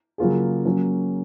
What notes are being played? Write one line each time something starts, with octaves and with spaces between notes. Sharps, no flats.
C#3 F#3 A#3 F4 G#4
F#3 A#3 C#4